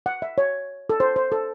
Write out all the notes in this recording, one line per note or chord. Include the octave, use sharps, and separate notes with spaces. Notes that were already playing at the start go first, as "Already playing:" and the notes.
F#5
E5
C#5
A4
C5
C5
A4